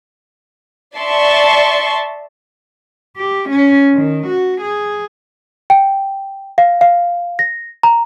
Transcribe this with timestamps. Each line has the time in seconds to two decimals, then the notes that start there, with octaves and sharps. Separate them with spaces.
0.97 D5 E5 A5 C6 C#6
3.17 G4
3.49 C#4
3.94 D#3
4.27 F#4
4.61 G#4
5.70 G5
6.58 F5
6.81 F5
7.39 A#6
7.83 A#5